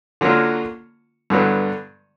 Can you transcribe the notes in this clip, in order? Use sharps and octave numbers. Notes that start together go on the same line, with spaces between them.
D3 F#3 A#3 C#4 F4
G2 D3 F#3 B3